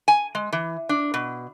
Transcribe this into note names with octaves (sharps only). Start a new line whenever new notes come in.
G#5
G#3
E3
D4
B2